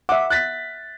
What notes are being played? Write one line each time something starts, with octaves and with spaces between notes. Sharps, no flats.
E5 F#5 D6
F#6 A6 B6